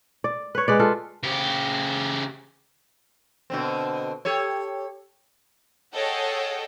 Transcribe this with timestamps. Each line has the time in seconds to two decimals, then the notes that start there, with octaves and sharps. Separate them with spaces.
0.24 D5
0.55 B4 C#5
0.68 G#3 B4 D5
0.79 F4 A4
1.23 C#3 G4
3.50 B2 D3 C4
4.25 G4 A4 C#5
5.94 G#4 A4 C#5 D#5 F#5 G5